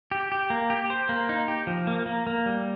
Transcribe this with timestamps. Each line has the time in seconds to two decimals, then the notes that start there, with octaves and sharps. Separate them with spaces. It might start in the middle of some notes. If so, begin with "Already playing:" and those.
0.11 G4
0.32 G4
0.50 A#3
0.70 G4
0.90 C5
1.09 A#3
1.29 D#4
1.48 G4
1.67 F3
1.87 A#3
2.06 A#3
2.27 A#3
2.46 G3